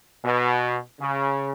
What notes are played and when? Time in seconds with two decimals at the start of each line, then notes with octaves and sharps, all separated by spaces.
0.24 B2
1.00 C#3